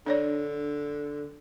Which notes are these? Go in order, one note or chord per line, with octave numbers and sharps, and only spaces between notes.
D3 D4 C#5 D5